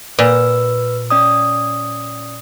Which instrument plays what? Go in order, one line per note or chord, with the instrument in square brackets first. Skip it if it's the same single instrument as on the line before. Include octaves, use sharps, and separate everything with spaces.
[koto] A#2 [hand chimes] B4 E6
[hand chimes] C#4 D5 D#6